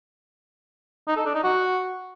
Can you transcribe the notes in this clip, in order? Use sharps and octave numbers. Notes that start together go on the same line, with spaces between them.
D#4
A4
D4
D#4
F#4